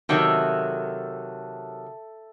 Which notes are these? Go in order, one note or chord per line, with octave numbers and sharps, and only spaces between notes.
C3 D#3 F#3 A4 E5